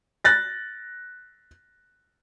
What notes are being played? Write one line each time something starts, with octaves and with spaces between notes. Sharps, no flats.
F#6 A6 A#6